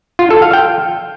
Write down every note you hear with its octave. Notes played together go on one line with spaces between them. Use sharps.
F4
A4
F5
G5